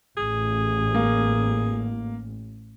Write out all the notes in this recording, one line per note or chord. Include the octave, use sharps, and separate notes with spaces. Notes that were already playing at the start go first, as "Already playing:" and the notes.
A1 G#4
A#3